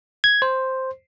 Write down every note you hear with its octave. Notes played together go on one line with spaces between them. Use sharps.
G#6
C5